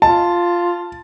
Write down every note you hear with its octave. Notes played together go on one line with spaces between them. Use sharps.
F4 A5